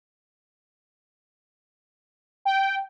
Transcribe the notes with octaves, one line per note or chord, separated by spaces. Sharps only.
G5